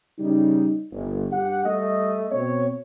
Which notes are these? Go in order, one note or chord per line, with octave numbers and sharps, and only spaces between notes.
C#3 G3 D#4
G1
G2 G4 F#5
G3 A3 D#5
B2 C4 C#5